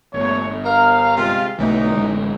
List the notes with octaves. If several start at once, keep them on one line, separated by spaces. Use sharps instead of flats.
G1 A#2 A3 C#5
A#4 F5
C3 G#3 F4
B1 D3 E3 F#3 A3 D#4
A1 D3 G#3